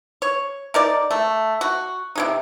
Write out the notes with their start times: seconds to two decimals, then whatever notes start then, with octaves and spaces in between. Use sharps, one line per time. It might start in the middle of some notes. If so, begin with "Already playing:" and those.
0.22 C#5
0.74 D#4 A#4 D5
1.11 A3
1.61 F#4
2.15 C3 G#3 D#4